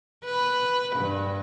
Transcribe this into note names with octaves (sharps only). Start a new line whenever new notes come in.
B4
G2